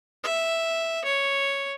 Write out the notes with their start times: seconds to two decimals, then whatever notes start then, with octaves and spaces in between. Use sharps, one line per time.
0.24 E5
1.05 C#5